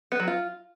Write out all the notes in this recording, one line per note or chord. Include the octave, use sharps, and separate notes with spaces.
B3
F#3
F4